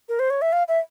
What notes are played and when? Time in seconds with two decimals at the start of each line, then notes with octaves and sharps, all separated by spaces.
0.09 A#4
0.19 C5
0.30 C#5
0.42 E5
0.52 F5
0.68 E5